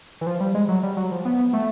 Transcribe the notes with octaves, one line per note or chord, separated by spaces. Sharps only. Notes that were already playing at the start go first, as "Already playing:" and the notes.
E3
F3
G3
G#3
F#3
G3
F#3
F3
B3
A3